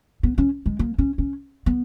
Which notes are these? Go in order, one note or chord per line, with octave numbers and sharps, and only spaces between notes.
B3
C#4
G#3
A#3
C#4
C#4
B3